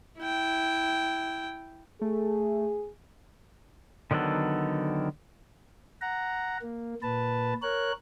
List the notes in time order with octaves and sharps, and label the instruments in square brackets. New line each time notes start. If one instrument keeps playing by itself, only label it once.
[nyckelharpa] E4 G5
[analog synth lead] A3 [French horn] G#4
[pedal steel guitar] D3 D#3 F#3 B3 A4
[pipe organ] F#5 A#5
A#3
A#2 B4 A5
A#4 C#5 F#6